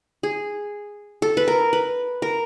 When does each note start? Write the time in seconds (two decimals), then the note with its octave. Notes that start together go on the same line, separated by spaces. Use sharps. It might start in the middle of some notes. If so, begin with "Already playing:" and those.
0.23 G#4
1.22 A4
1.37 B4
1.48 A#4
1.73 B4
2.22 A#4